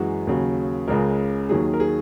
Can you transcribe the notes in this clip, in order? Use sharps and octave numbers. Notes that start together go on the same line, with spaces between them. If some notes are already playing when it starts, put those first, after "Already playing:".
Already playing: F#2 E3 G#3 F#4
D#2 C#3 F#3
C#2 C#3 G#3 A#4
D#2 D#3 F#3 G#4
A#4
G#4